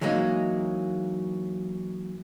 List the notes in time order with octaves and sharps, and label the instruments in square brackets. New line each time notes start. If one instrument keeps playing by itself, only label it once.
[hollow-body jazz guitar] E3 F#3 G#3 A#3 D#4